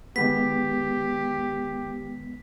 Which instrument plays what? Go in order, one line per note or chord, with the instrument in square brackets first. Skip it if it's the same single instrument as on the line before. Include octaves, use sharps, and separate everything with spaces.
[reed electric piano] D#3 G#3 B3 [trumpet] G4 [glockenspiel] B6